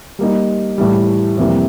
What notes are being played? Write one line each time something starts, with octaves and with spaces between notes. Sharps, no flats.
G3 A#3 D#4
A2 E3 G3
F2 C3 E3 G3 A#3